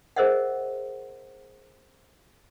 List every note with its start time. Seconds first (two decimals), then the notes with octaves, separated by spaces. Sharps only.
0.16 G#4 A#4 C5 D#5 E5 F#5